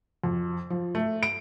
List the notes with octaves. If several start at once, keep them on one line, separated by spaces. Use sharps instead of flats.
F2
F3
A3
D7